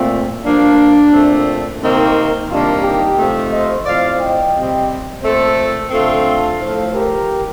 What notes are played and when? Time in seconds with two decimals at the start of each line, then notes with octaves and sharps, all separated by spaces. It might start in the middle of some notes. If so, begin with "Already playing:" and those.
Already playing: A#2 A3 C4
0.45 G2 F3 A#3 D4
1.13 A#2 A3 C4
1.81 C3 D#3 A#3 C4 D#4
2.50 C3 D#3 G3 A#3 D4 F4
2.83 D#4 G4
3.18 C3 F3 A3
3.52 C5 D#5
3.86 A2 F3 C4 D5 F5
4.20 D#5 G5
4.55 C3 G3 C4
5.23 A#2 A3 C4 A4 C5
5.91 D3 A3 C4 F4 A4
6.60 A2 F3 A3
6.93 G4 A#4